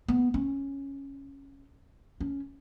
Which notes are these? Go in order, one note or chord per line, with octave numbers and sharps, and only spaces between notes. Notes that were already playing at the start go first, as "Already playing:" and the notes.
B3
C#4
C#4